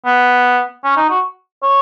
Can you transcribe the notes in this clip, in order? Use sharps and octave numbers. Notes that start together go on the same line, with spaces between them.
B3
C#4
D#4
F#4
C#5